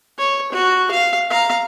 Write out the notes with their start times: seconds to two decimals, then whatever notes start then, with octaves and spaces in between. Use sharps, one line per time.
0.18 C#5
0.52 F#4
0.91 F5
1.30 F5 A#5